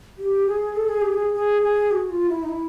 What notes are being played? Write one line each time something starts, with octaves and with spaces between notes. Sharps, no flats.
G4
G#4
A4
G#4
G4
G#4
G#4
G#4
F#4
F4
E4
D#4
E4